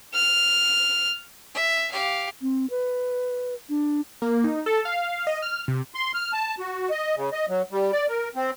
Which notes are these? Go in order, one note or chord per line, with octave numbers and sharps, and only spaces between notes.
F6
E5
G4 F5
C4
B4
D4
A#3
D#4
A4
F5
D#5
F6
C3
C6
F6
A5
F#4
D#5
C#3
D#5
F#3
G3
D5
A#4
C4